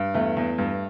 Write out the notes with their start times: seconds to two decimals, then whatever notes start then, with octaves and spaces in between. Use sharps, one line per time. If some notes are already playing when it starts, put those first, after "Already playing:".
Already playing: G2
0.14 E2 A3
0.37 E2
0.58 G2